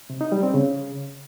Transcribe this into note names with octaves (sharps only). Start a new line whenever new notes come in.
C3
D#4
G3
C4
C#3